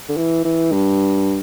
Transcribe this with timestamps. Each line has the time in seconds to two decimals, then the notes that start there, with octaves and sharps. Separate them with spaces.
0.09 D3
0.17 E3
0.45 E3
0.72 G2